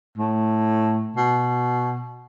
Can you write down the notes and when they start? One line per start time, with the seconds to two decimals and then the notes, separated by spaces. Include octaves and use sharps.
0.18 A2
1.16 B2